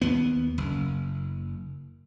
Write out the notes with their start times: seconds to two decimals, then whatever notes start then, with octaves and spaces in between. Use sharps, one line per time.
0.02 D#2 B3
0.58 F#1